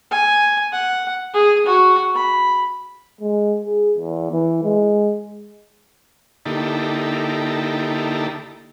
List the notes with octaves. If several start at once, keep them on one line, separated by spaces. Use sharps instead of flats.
G#5
F#5
G#4
F#4
B5
G#3
G#4
E2
E3
G#3
D3 A#3 D#4 E4 G4 A4